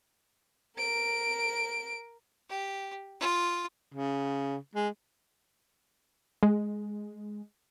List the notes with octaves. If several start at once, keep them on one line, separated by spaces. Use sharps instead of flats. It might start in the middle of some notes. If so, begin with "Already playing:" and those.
A#4 D7
G4
F4
C#3
G#3
G#3